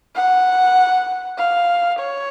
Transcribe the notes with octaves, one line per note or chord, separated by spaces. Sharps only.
F#5
F5
C#5